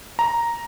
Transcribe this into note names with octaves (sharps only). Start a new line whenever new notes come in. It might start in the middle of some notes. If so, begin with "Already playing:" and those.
A#5